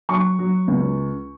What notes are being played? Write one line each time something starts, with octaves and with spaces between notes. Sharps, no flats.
F#3 C#6
F#3
C#2